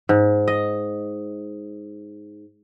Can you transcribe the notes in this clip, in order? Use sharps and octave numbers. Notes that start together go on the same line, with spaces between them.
G#2
D#5